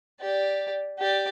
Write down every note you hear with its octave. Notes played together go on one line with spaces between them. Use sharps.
G4 D5
G4 D5